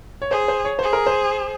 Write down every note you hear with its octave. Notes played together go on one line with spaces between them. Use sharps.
C#5
G#4 C5
C5
C#5
G#4 C5
A#4
C5